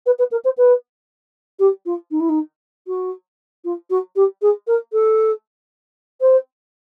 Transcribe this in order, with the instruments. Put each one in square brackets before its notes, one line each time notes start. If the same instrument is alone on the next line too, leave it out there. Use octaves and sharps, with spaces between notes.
[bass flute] B4
B4
A#4
C5
B4
G4
F4
D#4
E4
D#4
F#4
F4
F#4
G4
G#4
A#4
A4
C5